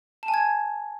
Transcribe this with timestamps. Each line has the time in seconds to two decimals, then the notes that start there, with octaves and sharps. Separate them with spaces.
0.23 A5
0.28 G#5
0.34 G#6